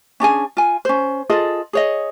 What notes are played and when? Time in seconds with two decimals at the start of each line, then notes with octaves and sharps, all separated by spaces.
0.20 C#4 D4 G#4 G#5
0.57 F4 G#5
0.85 C#4 C5
1.30 F4 G#4 A4 D#5
1.73 G#4 C#5 D#5